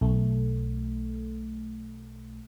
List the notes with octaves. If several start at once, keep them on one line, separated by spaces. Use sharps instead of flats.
B1 A3